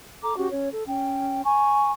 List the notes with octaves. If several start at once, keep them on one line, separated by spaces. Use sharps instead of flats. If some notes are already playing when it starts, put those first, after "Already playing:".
A4 A#5 D6
C#4 F#4 G4
C#4 C#5
A4
C#4 G5
G#5 A#5 C#6